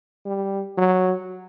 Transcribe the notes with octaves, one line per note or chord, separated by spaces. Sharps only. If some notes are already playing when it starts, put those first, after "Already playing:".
G3
F#3